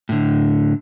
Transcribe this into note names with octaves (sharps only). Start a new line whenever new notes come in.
A2 D3